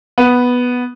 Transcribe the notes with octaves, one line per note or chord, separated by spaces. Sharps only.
B3